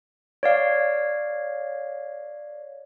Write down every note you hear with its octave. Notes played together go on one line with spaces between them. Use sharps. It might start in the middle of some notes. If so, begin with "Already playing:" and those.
C#5 D5 F5